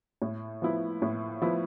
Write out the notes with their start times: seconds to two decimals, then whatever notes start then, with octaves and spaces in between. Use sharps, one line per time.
0.22 A2
0.62 F3 B3 E4
1.02 A2
1.42 F3 B3 E4